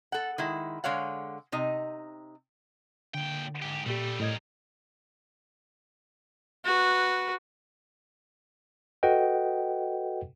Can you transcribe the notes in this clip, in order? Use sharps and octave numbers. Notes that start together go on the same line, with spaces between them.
A4 F#5
D#3 G#3 E4
D3 G#3 C#5 F5 F#5
C3 D#4 D#5
A#2 D3 G5
G#2 G4
A#2 G3 A3 G4
A2 G3 A#4 D#5 G#6
F#4 B4
F#4 A4 B4 D#5 F#5 G5